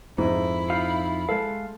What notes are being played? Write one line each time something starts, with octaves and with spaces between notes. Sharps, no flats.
F2 G#2 E4
D#4 F4 F5
G#3 A4 F5